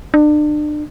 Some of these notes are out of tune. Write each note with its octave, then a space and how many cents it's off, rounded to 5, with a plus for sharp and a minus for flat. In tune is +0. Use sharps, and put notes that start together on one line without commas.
D4 +35